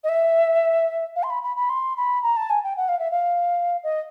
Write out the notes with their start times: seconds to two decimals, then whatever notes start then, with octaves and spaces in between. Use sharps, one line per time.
0.04 D#5
0.09 E5
1.16 F5
1.23 C6
1.30 B5
1.43 B5
1.57 B5
1.69 C6
1.97 B5
2.23 A#5
2.37 A5
2.50 G#5
2.64 G5
2.77 F#5
2.88 F5
2.99 E5
3.11 F5
3.83 D#5